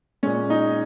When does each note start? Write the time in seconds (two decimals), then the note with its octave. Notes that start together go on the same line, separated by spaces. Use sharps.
0.23 A#2 G#3 C#4
0.50 D#4